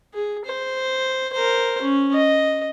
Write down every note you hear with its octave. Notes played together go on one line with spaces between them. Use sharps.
G#4
C5
A#4 C5
C#4
D#5